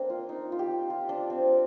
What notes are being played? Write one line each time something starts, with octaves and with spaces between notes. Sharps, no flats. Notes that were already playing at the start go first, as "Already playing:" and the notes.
Already playing: A#3 C4 D4
F4
D#4
F4
G4
F4
D4
C4